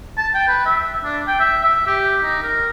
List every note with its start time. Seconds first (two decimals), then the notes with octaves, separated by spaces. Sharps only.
0.17 A5
0.34 G5
0.48 B4
0.66 E5
1.04 D4
1.27 G5
1.40 E5
1.64 E5
1.87 G4
2.23 D#4
2.42 A#4